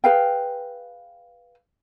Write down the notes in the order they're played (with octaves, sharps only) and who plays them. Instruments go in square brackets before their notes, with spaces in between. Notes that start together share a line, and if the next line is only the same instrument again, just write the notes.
[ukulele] G#4 B4 F5 G5